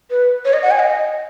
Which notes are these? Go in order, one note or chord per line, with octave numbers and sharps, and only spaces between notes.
B4
C#5
D#5
F#5
G#5
D#5